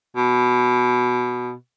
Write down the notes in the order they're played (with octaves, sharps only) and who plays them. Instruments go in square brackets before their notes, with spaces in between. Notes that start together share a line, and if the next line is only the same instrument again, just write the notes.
[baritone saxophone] B2